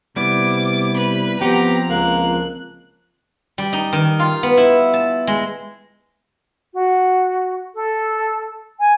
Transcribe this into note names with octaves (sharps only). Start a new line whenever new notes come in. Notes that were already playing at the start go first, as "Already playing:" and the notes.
C3 G3 B3 E4 D6
B4 B5
F3 B3 C4 G4 F#5 A#5
C#2 A#3 F#6
G3
D#4
D#3
F4
B3
E4
A5
G#3
F#4
A4
G#5